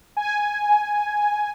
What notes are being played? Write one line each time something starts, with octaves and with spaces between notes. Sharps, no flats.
G#5